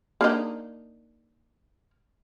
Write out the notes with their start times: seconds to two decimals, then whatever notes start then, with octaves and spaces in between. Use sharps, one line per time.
0.21 A#3 D4 D#4